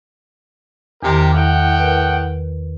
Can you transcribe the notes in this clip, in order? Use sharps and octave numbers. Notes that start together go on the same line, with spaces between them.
E2 C3 D#3 G4 A#4
A2 F#5 G5
A#4 B4